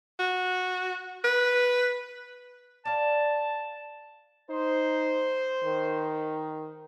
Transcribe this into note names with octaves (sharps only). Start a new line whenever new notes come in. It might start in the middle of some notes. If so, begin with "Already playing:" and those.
F#4
B4
D5 F5 A5
D#4 C5
D#3